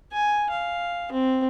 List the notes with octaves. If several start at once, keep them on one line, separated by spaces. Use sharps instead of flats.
G#5
F5
C4